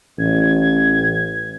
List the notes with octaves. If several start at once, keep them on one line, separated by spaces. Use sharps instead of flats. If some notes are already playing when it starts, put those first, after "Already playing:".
A1 G#6